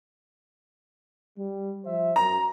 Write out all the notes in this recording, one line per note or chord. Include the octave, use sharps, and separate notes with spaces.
G3
F3 C5 E5
F#2 A#5